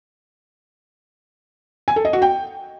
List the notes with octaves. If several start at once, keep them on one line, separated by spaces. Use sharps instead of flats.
G#5
A4
D#5
F#4
G5